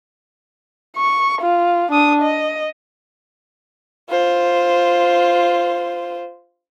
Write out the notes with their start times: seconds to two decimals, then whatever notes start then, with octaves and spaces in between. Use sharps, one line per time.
0.97 C#6
1.42 F4
1.92 D4 D#6
2.22 D#5
4.10 F4 C5